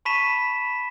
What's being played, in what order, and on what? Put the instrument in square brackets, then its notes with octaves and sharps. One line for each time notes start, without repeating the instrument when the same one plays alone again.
[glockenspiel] A5 B5 C#6 B6 D#7 E7